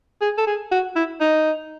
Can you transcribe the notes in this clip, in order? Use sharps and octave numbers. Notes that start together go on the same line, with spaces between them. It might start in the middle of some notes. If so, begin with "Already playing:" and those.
G#4
A4
G#4
F#4
E4
D#4